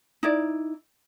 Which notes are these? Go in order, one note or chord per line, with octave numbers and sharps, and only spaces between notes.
D#4 E4 D5